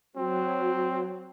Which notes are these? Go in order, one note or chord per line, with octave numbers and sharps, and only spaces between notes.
F#3 C4